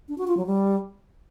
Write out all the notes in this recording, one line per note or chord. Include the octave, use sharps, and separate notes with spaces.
D4
F#4
F4
F#3
G3